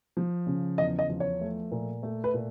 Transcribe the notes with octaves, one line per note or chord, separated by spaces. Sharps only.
F3
C#3
E2 D#5
D#5
F3
C#5
A3
A#2
A3
B4
A#2